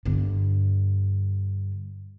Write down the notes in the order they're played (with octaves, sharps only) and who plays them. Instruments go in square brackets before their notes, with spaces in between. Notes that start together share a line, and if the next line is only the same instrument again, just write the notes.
[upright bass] G2 D3